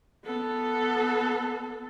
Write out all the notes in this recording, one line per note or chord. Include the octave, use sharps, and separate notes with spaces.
B3 A4